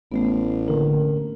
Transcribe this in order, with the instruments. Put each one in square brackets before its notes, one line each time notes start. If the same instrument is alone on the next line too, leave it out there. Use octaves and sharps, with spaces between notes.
[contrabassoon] A1 [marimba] A3 B3
[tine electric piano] D3 A#4 [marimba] A#3